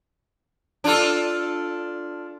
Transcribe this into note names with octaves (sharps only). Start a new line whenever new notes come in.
D4 F4 A4